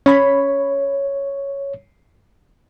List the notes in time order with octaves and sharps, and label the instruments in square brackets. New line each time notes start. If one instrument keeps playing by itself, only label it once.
[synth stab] C#4 B5 [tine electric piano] C#5